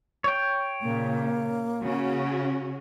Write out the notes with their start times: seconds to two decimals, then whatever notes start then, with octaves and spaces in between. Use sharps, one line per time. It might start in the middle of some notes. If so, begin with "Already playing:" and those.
0.24 C#5 G5
0.82 A#2 C#3 A#3
1.82 C#3 C#4 F#4